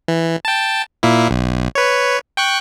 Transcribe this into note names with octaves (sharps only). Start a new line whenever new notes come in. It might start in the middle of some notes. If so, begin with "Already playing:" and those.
E3
G5 A5
A#2 A#3 E4
B1
B4 C#5
G5 C#6 F#6